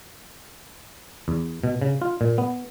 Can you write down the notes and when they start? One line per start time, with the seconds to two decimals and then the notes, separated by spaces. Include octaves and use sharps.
1.28 E2
1.64 B2
1.82 C#3
2.02 F4
2.21 A#2
2.38 B3